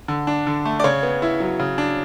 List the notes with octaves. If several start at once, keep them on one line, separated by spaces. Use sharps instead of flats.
D3
D4
D3
A3
D5
C#3 C#5
B3
E4
F#3
C#3
D4